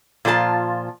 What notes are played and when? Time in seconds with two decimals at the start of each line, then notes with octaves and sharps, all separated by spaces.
0.25 A#2 F3 F4 C5 A5